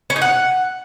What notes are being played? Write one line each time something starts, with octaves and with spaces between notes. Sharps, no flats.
C#4
D#4
F#5